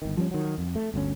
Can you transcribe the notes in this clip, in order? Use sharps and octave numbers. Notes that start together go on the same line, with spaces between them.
G1 D#3
F3 G3 C4 C#4
D#3 F#3
F2
A3
G1 D2 C3 C#4